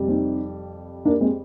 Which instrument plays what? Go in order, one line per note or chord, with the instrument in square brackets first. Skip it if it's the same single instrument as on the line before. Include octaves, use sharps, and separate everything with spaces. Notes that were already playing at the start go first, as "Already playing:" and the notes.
Already playing: [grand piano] F2 C3 G3
[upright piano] C4 D#4
A#3 D4
G#3 C4